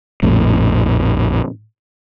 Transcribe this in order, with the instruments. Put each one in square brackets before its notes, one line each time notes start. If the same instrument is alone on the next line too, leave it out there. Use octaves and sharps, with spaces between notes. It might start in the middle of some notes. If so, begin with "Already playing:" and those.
[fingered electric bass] A#1 F2 A2